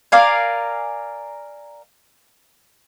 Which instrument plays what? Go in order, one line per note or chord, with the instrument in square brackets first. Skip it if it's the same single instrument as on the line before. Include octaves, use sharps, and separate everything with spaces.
[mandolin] A#4 D5 F5 G#5